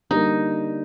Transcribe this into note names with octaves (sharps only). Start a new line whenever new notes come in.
D3 G3 A#3 D#4